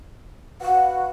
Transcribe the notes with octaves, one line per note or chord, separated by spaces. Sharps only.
F#4 B4 F5 F#5